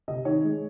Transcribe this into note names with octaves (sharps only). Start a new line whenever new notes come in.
C3 D#5
D#3 C#5
G#3